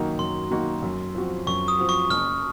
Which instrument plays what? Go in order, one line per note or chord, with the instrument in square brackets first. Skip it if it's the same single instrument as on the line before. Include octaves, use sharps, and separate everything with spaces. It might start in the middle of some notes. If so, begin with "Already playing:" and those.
Already playing: [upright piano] F#2 D#3 A#3 D#4 F#4
[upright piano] F#2 [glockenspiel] C6
[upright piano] D#3 A#3 D#4 F#4
F#2
F3 C4 F#4
[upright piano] F#2 [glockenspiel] C#6
[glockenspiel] D#6
[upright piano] F3 C4 F#4
[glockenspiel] C#6
[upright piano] F#1 [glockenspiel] F6